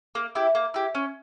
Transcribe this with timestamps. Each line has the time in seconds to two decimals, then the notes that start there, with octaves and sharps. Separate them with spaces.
0.15 A#3
0.35 E4 G4
0.55 A#3
0.74 E4 G4
0.95 C#4